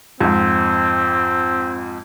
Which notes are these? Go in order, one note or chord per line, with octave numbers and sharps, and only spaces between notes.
F2 G#2 C4